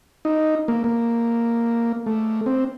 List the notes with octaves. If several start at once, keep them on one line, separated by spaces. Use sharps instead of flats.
D#4
A#3
A#3
A3
C4